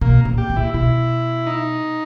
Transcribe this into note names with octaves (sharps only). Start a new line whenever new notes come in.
B2 A#3
A#2
G4
A#2
E4
B2 E4
D#4